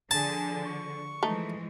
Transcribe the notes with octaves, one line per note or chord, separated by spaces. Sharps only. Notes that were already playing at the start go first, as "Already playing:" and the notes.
D3 F3 G#4 G#5 A5
C#6
E3 F3 G#3 A3 D#4